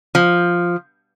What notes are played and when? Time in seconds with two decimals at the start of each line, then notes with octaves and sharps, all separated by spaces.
0.15 F3